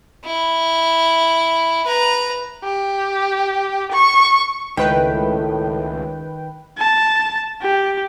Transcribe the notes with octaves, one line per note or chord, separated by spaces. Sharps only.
E4
B4 A#5
G4
C#6
C#2 A2 D#3 B4 G5
A5
G4